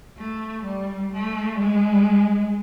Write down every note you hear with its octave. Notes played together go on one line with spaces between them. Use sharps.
A3
G3
A3
G#3